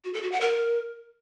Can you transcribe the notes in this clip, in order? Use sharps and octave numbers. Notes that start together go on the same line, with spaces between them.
F#4
A4
F#4
F#5
A#4